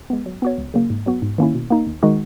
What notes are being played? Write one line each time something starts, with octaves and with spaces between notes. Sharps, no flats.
G#3 B3
F#3
B3 F#4 C#5
C#2
C#3 F#3 A#3
G#2
F#3 B3 F#4
G#2
D#3 A#3 C#4 E4
B2
A#3 D#4
D#2
D#3 G#3 D#4 F#4